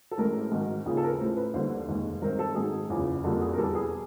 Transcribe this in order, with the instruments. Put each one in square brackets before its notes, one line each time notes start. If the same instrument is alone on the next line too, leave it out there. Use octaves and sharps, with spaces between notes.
[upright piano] A4
A1 A2 E3 G#3 A#4
G#2 D#3 F#3
D#2 C#3 F3 G#4
A4
A#4
B4
A1 A2 F3 C5
B4
D#2 D3 G3 C5
F1 D#2 D#3 G#3
G2 D#3 G#3 C4 A#4
A4
G#2 D#3 F#3 G#4
F#1 E2 C#3 F3
F2 D3 G3 A#3 A4
G#4
A#4
E2 B2 G3 B3 A4
G#4